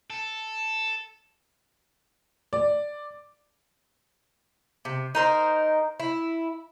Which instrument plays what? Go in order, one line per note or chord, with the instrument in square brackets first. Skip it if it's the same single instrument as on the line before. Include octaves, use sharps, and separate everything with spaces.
[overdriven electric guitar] A4
[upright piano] D5
[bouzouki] C3
D#4 A#4 C5
E4